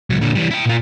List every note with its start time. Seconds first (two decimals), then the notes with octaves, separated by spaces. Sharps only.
0.10 C#2 F#3
0.21 A#2 D3
0.35 E3 G3
0.51 E4 G5
0.65 A#2 F4